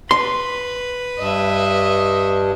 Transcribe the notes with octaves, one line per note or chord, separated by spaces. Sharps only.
B4 C6
G2 D#5 E5